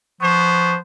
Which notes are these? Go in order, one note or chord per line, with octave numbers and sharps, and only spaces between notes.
F3 B3 C5 C#6